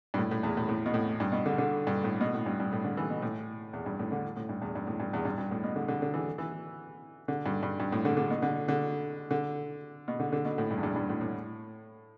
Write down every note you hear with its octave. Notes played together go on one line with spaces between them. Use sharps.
G2
A2
A2
E2
A2
A2
B2
A2
G2
B2
D3
D3
G2
A2
B2
A2
G2
G2
A2
D3
E3
B2
A2
E2
G2
A2
D3
A2
G2
E2
G2
A2
G2
E2
G2
G2
A2
B2
D3
D3
D3
E3
E3
D3
G2
G2
G2
A2
D3
D3
B2
D3
D3
D3
B2
D3
D3
B2
A2
G2
E2
G2
G2
A2
A2